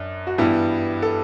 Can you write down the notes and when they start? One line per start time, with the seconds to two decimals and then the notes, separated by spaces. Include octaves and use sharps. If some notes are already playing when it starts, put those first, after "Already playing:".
Already playing: F#2 D4
0.27 F#4
0.38 G2 E3 G3 B3 E4
1.02 A4